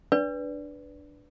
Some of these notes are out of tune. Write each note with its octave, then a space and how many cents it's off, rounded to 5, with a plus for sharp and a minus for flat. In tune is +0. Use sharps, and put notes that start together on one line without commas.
D4 +0 B4 +0 D5 -20